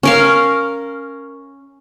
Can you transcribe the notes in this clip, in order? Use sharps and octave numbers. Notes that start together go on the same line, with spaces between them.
C#4 A#4 F5